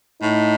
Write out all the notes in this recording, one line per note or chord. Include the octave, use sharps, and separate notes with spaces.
A2 D#4